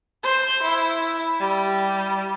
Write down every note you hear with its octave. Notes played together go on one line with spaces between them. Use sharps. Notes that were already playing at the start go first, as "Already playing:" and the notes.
C5
E4
G3